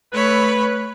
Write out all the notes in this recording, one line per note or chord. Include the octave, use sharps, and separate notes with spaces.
A3 B4 C#5 B5